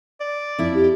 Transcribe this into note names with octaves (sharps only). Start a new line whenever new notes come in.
D5
F2 E4
G4